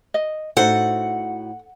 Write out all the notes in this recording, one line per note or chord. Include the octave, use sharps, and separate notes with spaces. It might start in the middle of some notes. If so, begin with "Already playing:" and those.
D#5
A2 D#4 F#4 A4 C5 F#5